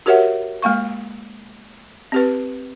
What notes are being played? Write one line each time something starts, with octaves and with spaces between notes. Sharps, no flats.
F#4 G4 A#4 C#5 E5 F#5
G#3 A#3 F5 C#6
C4 G4 B4